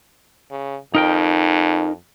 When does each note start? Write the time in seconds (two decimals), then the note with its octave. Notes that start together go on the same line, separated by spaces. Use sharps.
0.51 C#3
0.95 F2 D#4 A#4 G5